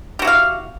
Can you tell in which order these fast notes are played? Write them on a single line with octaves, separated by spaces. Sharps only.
G4 F#4 E4 F5